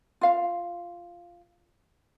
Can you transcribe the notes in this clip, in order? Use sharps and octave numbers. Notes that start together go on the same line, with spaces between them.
F4 F5